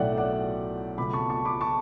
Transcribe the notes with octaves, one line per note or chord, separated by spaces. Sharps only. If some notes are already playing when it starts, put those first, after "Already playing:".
Already playing: B1 A2 F#3 A3 D5 E5 F#5 G5
D5 F#5
C#2 B2 A3 B5 D6
A5 C#6
A5 C#6
B5 D6
A5 C#6